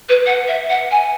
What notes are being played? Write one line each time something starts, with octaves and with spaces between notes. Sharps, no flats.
B4
F#5
E5
F#5
G#5